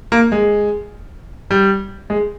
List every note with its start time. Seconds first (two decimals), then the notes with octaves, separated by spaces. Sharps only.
0.12 A#3
0.32 G#3
1.51 G3
2.10 G#3